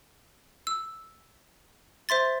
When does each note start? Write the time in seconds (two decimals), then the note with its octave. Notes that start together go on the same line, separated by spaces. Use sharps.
0.67 E6
2.09 C5 E5 C6 A6